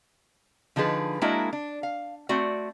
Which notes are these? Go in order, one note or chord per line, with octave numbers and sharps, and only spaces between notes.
D3 F3 D#4 G#4 B4
G#3 A#3 D4 E4 F#4 A#4
D4
F5
A3 C4 F#4 D5